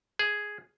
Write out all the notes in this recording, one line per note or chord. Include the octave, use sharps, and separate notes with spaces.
G#4